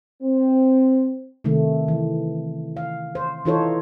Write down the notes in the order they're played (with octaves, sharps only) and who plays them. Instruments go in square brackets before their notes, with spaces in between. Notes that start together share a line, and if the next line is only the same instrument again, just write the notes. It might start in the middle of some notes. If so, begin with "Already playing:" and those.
[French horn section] C4
[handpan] C3 D#3 A3
E3
F5
C5
E3 D#4 F4 A4 C5 C#5